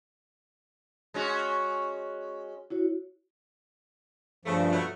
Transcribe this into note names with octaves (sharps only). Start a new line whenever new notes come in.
G#3 C#4 F#4
E4 F#4 C#5
G2 C#3 F3 A3
B2 F#3 A3